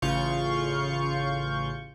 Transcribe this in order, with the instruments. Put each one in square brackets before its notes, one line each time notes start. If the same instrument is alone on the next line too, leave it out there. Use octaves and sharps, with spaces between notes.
[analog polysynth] A1 C#3 F4 F5 C#6 G6